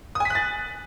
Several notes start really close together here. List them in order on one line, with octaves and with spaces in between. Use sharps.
D#6 G#5 B6 F#6 A6